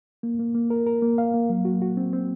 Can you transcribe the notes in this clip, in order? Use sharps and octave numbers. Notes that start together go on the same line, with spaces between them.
A#3
A#3
A#3
A#4
A#4
A#3
F5
A#3
F#3
F#4
F#4
C4
C4